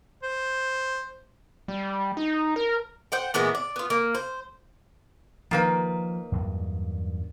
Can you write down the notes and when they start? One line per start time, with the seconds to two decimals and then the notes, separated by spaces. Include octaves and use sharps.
0.23 C5
1.68 G3
2.17 D#4
2.56 A#4
3.12 C5 F#5 G5
3.34 A#2 E3 G#3 B3
3.55 D5
3.76 B3 F4
3.90 A#3
4.15 C5
5.51 D#3 F3 A#3 B4
6.32 E2 G2 F#3